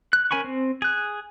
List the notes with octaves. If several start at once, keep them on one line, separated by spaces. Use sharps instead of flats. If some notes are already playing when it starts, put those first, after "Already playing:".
F#6
C#4 A#4 G#5 B5 C#6
C4
G#4 F#6